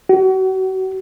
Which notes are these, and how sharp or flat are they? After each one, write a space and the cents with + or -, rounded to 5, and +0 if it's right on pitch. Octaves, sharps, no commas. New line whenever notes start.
F#4 +35